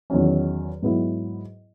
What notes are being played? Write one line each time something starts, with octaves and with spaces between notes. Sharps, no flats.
E2 D#3 F#3 C#4
G#2 F#3 B3 E4